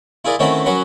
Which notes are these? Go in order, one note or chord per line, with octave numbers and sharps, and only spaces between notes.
E4 F4 G#4 A#4 D5
D#3 A3 C4 C#4 E4 F#4
F#3 C#4 A#4 B4 F#5